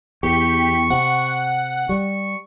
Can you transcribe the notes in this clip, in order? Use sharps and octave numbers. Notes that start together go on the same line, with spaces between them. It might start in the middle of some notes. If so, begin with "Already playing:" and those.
E2 G4 C#6
C3 F#5
G3 C#6